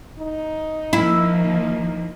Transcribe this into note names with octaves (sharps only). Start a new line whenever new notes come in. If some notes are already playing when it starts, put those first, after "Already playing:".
D#4
D#3 F3 A#3 E4